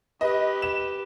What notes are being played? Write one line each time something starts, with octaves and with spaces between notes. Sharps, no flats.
G4 B4 D#5
E7